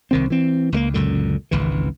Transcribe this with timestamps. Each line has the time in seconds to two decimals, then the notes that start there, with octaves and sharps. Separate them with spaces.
0.11 C2 D#3 C4
0.30 E3 C4
0.72 C#2 A3 A#3
0.94 C#2 F#2 A#2 D3
1.51 G#1 C#2 E3